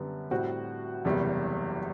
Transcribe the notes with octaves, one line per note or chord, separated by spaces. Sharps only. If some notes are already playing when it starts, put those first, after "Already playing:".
Already playing: F#2 D3 G3 B3
A2 G3 C4 F#4
F#1 E2 C3 G3